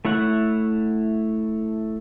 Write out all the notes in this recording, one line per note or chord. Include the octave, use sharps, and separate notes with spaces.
A3 E4 C#5 F#5